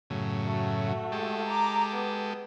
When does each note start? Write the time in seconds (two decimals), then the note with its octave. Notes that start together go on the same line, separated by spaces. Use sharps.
0.10 F#2 A2 C#3
0.46 A3 F#4
1.12 G#3 G4 A4
1.48 A#5 D6
1.95 B3